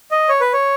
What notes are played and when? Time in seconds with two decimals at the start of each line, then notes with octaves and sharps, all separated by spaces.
0.11 D#5
0.29 C#5
0.41 B4
0.53 C#5